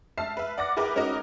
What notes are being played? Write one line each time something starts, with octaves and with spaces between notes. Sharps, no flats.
E5 A5 F6 C7
B4 E5
D5 F#5 D6 A#6
E4 G#4 A#4 B4 G5
C#4 D#4 F#4 A#4 D#5